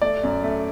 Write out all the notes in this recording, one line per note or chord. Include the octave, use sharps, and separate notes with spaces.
A3 D5
F#2
A3